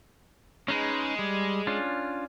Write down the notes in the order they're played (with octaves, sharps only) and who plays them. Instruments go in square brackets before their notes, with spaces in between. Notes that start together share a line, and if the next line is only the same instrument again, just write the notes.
[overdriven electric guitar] G#3 [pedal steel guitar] C#4 D#4 B4
[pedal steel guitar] G3
C#4 D4 F4